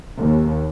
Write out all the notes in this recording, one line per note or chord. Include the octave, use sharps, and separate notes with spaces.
D#2